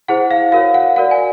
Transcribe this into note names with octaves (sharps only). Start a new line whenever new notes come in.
E4 G#4 C5 F#5
F5
F#4 A#4 C#5 F5
F#5
F#4 A#4 D5 F#5
G#5